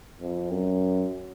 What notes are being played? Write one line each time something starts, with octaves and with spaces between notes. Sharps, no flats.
F2
F#2